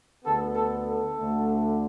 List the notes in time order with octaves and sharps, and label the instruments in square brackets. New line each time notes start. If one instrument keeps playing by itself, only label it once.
[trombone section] D2 D3 B3 A4
A4
A4
D2 D3 A3